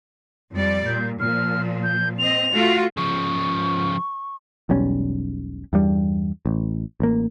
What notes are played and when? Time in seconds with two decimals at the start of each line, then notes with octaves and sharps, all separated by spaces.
0.52 F2 G3 D5
0.86 A#2 G6
1.20 A#2 F3 F6
1.84 G6
2.19 C4 D#5 F7
2.53 A3 F4 F#4
2.97 C#3 F3 C#6
4.69 E1 B1 G3 C#4
5.73 E2 G2 G3
6.46 A1
7.00 A1 A#3